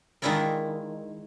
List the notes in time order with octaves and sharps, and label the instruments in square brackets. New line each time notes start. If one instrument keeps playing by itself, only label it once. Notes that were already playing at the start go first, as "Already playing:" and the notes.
[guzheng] D#3 G#3 D4 E4 F4 A#4